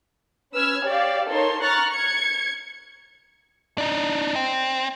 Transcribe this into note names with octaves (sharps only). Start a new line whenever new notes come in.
C#4 B4 E6 F6 G#6
G4 C#5 D5 F5
D#4 A4 A#4 C#5 C6
A#5 C#6 F6 F#6 A6
G#6 C#7
D4 D#4
C4